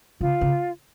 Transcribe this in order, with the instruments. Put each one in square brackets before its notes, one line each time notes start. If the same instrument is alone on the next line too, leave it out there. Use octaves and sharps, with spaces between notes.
[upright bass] C#3 [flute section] F4
[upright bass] C#3